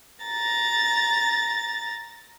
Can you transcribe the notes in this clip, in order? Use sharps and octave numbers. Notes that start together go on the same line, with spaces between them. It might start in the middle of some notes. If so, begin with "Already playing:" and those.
A#5 A6